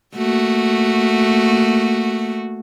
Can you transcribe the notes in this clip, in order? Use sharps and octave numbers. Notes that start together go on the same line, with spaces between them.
A3 A#3 F#4